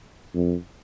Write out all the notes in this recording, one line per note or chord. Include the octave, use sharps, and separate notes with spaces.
F2